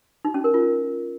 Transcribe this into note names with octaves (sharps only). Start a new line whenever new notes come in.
D#4
C#4
A#4
F4